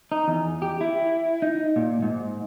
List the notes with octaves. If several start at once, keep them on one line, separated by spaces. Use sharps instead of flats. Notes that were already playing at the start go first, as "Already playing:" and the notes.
D#4
E2
G4
E4
D#4
A#2
G#2